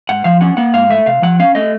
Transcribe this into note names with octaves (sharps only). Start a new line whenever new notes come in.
G#2 F#5
F3 F5
C#4 F#5
A#3 F#5
G#2 F5
A3 E5
C3 F5
F3 F#5
C#4 F5
A3 D#5